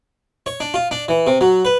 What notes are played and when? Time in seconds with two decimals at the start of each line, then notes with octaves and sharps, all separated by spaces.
0.46 C#5
0.60 D4
0.74 F4
0.91 D4
1.08 E3
1.27 C3
1.41 F#3
1.65 B4